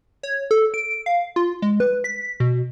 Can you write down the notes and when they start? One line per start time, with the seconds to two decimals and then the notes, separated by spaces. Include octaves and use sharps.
0.23 C#5
0.51 A4
0.74 D7
1.06 F5
1.36 F4
1.62 G#3
1.80 B4
2.04 B6
2.40 B2